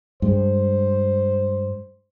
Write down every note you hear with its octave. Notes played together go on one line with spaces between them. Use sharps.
G2 G#3 C5